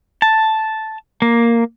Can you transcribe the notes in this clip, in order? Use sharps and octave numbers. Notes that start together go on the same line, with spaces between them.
A5
A#3